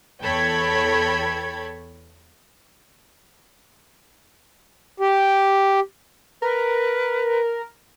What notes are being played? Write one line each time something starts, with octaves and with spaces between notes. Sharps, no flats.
E2 A4 C#5 G5 B5 G#6
G4
A#4 B4